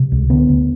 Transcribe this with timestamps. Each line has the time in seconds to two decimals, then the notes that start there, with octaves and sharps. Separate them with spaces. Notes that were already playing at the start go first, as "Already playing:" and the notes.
Already playing: C3
0.12 C#2
0.30 D3 B3
0.49 D2